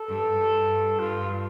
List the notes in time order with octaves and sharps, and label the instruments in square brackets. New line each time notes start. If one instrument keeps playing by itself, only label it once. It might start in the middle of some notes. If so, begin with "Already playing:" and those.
Already playing: [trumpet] A4
[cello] G2
G2
[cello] G2 [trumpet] F4